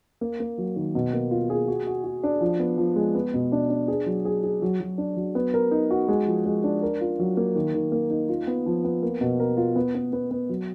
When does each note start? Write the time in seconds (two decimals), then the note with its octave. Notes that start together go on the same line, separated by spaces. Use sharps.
0.21 A#3
0.40 A#3
0.58 F#3
0.76 D#3
0.95 B2
1.13 A#3
1.31 F4
1.50 G#4
1.68 F#4
1.87 F#4
2.04 F#4
2.23 D4
2.41 F3
2.60 B3
2.78 F3
2.96 G#3
3.15 B3
3.34 B2
3.52 D4
3.70 D4
3.88 G#4
4.06 F#3
4.25 G#4
4.43 G#4
4.62 F#3
4.80 F#3
4.98 D4
5.17 F#3
5.35 B3
5.54 A#4
5.71 D#4
5.91 F#4
6.08 G#3
6.27 F3
6.45 G#3
6.64 D4
6.82 A#4
7.01 F4
7.19 F#3
7.37 A#3
7.55 D#3
7.74 D#3
7.92 A#3
8.10 D#4
8.29 F4
8.47 B3
8.66 F3
8.84 B3
9.03 A#3
9.21 B2
9.40 A#4
9.57 F4
9.76 B3
9.95 B3
10.13 B3
10.31 B3
10.49 F#3